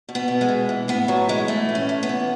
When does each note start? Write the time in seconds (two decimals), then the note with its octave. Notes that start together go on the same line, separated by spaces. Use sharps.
0.09 B2
0.15 B3
0.28 B2
0.41 G#3
0.49 B2
0.69 E3
0.88 A2 B3
1.08 A2 F#3
1.29 E3 G#3
1.48 E3 A3
1.69 A2
1.75 C#4
1.89 A2
2.03 B3
2.09 E3